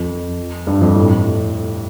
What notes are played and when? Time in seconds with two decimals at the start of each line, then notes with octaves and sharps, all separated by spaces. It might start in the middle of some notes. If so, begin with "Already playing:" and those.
Already playing: F2
0.67 G2
0.81 F2
0.96 A2